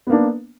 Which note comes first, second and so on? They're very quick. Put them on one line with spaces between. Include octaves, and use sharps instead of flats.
B3 A#3 D4